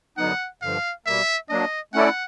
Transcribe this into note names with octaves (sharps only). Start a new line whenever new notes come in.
F#2 D3 F#3 B3 D#4 F#5
G2 D3 F3 F5
B2 G3 A#3 E5
F#3 A#3 D4 D#5
A3 C#4 E4 A4 D5 F#5